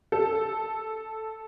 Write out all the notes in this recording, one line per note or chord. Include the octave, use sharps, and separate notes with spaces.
A4